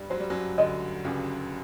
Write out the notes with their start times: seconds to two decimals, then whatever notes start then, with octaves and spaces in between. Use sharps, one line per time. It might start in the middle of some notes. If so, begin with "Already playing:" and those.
Already playing: G2 G3
0.10 F#3 C5
0.20 G3
0.30 F#2 F#3
0.58 D2 D3 D#5
1.04 C#2 C#3 G4